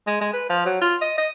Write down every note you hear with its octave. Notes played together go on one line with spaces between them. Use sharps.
G#3
G#3
B4
F3
F#3
F4
D#5
D#5